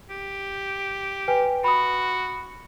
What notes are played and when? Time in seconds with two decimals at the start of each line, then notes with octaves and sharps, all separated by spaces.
0.10 G4
1.28 B4 G5 G#5
1.64 F#4 B5 D#6